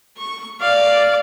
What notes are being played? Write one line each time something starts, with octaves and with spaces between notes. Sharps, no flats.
C#6
D5 F5